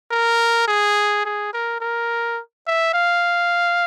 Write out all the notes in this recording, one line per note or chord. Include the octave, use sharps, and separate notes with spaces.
A#4
G#4
G#4
A#4
A#4
E5
F5